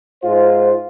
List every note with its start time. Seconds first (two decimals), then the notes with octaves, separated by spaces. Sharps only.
0.23 G#2 F4 C5